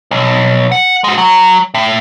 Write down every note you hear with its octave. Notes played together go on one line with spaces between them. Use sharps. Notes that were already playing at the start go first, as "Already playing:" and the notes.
B1
F#5
G#3 F#4
F#3
A2